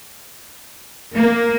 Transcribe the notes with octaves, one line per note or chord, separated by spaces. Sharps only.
A#3